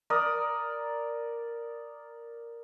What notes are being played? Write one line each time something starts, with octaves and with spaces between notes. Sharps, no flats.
A#4 D5 D#6